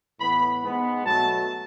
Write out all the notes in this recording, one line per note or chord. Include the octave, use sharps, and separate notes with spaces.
A2 E3 B3 B5
G#2 G#3 B3
B2 F#3 A3 A5